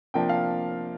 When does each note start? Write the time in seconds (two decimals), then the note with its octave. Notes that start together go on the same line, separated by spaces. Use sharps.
0.14 C3 F3 A#3 D4 G5
0.29 F5